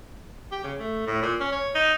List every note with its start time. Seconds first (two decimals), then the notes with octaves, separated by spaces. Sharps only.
0.51 G4
0.64 C#3
0.79 A3
1.07 A2
1.22 A#2
1.40 C#4
1.52 C#5
1.75 D#4